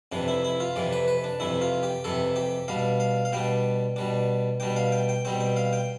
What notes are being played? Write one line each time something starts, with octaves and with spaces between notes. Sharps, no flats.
F2 C3 E3 D4
E4
E4
F4
F2 C3 E3 D5
B4
B4
D4
F2 C3 E3 E4
F4
G4
F2 C3 E3 A4
G4
B2 G3 D4 F5
F5
F5
B2 G3 D4 G5
B2 G3 D4
B2 G3 D4 G5
F5
G5
G5
B2 G3 C4 G5
G5
F5
G5